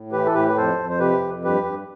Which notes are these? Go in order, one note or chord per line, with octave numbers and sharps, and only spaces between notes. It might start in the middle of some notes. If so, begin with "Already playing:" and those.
Already playing: A2
E3 G4 B4
A4
A2 G4 B4
B4
F2 A4 C5
F2
C5
C3 G4 B4
F2
G2 G4 B4
G2